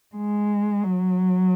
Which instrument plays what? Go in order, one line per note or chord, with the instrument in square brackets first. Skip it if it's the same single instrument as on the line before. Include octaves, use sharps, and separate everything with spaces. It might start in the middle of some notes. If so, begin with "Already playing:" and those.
[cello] G#3
F#3